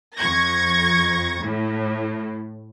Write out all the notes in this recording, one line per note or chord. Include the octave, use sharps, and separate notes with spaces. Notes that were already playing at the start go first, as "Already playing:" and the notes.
F2 C#6 G#6 A#6
A2